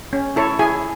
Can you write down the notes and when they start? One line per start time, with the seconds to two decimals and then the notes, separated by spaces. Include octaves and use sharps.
0.13 C#4
0.36 E4 A4 C#5
0.59 E4 G#4 G#5